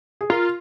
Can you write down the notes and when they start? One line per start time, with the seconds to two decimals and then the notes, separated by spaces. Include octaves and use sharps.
0.21 G#4
0.30 F4 A#4